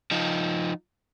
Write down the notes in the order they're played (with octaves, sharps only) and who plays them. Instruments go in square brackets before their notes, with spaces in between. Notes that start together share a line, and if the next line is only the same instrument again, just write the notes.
[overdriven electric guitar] F3 D#4